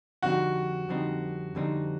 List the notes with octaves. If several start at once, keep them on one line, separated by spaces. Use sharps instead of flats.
F2 D3 G3 C4 D#4 F#4
F2 D3 G3 C4 D#4
F2 D3 G3 C4 D#4